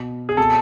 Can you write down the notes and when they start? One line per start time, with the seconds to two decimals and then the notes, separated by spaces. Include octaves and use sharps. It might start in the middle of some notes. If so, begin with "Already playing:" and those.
Already playing: B2
0.29 G#4
0.37 B2 A4